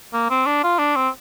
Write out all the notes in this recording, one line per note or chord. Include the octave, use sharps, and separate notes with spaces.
A#3
C4
D4
F4
D4
C4